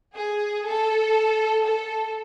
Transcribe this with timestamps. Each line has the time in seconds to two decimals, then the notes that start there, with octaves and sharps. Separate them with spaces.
0.15 G#4
0.65 A4
1.65 A4